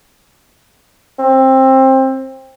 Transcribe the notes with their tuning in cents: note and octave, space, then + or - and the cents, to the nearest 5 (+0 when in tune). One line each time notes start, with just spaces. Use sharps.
C4 +20